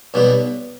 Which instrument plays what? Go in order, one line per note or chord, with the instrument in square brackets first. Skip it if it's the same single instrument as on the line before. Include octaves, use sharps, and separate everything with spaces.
[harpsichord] B1 B2 G3 B3